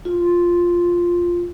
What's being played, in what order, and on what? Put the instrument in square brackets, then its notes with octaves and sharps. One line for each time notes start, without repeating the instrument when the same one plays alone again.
[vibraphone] F4